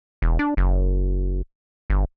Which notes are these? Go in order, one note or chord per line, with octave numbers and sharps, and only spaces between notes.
E1
D4
F#1
G1